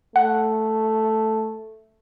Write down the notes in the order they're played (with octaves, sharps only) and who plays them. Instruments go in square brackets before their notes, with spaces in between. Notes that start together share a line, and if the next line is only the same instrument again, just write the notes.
[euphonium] A3 [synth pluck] F#5